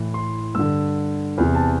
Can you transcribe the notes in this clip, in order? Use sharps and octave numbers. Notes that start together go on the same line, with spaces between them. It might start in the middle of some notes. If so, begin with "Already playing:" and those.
Already playing: A2 E3
C6
G2 D3 E6
E2 C3 E3
A5